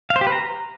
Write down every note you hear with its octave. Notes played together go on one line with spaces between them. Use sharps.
F5
C5
G4
B4
A#5